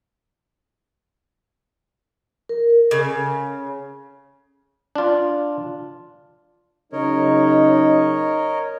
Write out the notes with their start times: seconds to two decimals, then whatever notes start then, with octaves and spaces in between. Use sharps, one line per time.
2.49 A#4
2.91 C#3
4.96 D4 F4
6.92 C#3 F#3 D#4 A#4 C#5 D#5